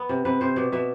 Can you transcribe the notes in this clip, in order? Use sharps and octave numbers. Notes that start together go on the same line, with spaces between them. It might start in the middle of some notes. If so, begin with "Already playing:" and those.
Already playing: B3
C3
C3 B4
C3 C5
B2 D5
B2 E5